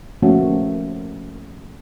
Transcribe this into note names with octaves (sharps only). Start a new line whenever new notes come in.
F3 A3 A#3 C#4 F#4